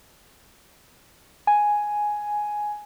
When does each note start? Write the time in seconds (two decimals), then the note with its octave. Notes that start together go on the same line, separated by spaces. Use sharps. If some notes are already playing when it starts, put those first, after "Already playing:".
1.47 G#5